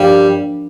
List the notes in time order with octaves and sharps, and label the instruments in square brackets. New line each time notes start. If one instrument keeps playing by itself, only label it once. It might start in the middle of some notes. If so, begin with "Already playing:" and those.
Already playing: [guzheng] G2 F3 A#3 [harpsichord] G3